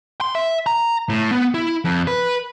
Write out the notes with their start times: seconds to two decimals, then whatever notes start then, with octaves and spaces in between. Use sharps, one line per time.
0.21 C6
0.35 E5
0.66 A#5
1.10 A2
1.31 B3
1.54 E4
1.85 F2
2.07 B4